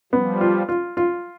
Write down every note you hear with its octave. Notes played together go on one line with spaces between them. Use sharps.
F3 G3 B3
F4
F4
F4